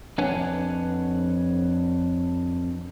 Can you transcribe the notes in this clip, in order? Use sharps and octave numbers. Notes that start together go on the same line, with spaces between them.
F2 D4 B4 C#5 F#5 G#5